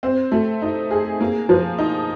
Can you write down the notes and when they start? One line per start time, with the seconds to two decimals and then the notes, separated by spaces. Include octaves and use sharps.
0.03 C4
0.32 A3
0.62 D#4
0.91 G#4
1.21 A#3
1.49 F3
1.79 D#4